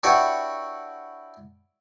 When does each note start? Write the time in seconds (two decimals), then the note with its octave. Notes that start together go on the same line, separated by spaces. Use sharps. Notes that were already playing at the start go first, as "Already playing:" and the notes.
0.03 D4 E4 F#4 G4 B4 C#5